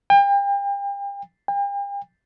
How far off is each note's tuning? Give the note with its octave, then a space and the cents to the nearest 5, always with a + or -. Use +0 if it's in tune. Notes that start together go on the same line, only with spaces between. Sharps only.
G5 +35
G5 +40